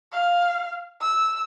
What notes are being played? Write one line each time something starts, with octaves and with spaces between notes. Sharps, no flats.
F5
E6